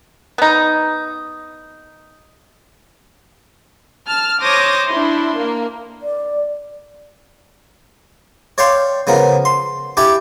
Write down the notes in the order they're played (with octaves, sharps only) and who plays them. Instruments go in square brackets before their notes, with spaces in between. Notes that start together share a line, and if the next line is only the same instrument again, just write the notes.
[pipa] B3 D#4
[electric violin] A5 [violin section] F6
[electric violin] C5 C#5 [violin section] D6 D#6 A#6
[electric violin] D4 C6 [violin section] E4
[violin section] A#3
[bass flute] D5
[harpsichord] C#5 D5 F5 G5 C6
C#3 F3 B3 A#4
C6
D4 E4 G4 D5 E5 G#5